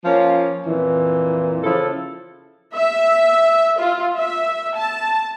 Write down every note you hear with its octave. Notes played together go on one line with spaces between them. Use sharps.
F3 A#3 C#4 F4
F2 A#2 E3
C#3 F3 E4 A4
E5
F4
E5
A5